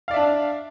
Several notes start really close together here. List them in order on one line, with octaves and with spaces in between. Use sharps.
F5 D5 E5 D4